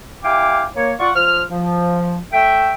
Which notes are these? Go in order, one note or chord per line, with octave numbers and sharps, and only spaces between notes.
E4 G4 F5 G5 G#5 D6
A#3 C#5
F4 D5 F#5 C#6
F3 F6
F3
A3 E5 G5